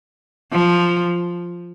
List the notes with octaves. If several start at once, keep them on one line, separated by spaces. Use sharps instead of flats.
F3